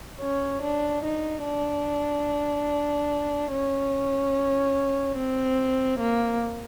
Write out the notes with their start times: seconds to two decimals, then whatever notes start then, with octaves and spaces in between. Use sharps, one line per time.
0.21 C#4
0.63 D4
1.04 D#4
1.45 D4
3.52 C#4
5.17 C4
5.99 A#3